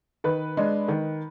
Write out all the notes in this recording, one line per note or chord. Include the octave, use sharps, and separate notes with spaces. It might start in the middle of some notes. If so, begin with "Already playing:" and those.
D#3 B4
G#3 D4
D#3